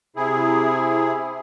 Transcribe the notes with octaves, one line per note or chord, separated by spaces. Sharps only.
C3 E4 G#4